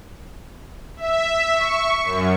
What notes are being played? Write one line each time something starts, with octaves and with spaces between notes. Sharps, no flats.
E5
C#6
F#2